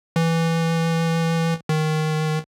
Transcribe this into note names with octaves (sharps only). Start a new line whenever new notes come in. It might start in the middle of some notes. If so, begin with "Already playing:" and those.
E3
D#3